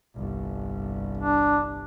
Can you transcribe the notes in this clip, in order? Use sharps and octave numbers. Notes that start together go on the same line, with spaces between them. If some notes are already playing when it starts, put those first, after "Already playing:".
G1 C2
D4